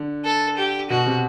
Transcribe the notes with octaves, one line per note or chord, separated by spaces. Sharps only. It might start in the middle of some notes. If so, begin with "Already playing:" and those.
Already playing: D3
A4
G4
B2 F#4
C3